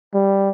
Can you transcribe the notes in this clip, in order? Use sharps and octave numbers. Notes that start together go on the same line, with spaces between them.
G3